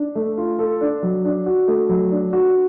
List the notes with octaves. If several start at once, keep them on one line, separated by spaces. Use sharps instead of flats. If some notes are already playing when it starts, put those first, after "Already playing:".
Already playing: D4
A3
F4
A4
D4
F#3
D4
F#4
A3
F#3
D4
F#4